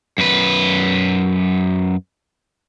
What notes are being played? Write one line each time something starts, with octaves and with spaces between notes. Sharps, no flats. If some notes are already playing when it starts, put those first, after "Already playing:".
F#2 B4